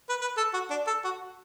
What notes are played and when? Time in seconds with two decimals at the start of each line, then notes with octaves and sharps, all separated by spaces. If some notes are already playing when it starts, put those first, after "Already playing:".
0.10 B4
0.21 B4
0.37 A4
0.54 F#4
0.71 D4
0.87 A4
1.04 F#4